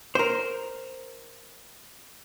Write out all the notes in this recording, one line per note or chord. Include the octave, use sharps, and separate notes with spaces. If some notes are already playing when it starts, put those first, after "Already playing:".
A#4 C5